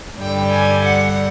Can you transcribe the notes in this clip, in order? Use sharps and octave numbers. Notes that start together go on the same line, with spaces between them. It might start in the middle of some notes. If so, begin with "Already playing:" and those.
G2 D3 G3 G5
G#5
F#5